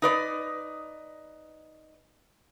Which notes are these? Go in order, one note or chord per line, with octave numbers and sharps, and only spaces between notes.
D#4 B4 D5